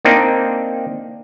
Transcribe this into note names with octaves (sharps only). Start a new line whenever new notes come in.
A#3 C4 D4 D#4